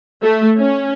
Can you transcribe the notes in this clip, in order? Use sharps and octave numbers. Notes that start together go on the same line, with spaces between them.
A3
C#4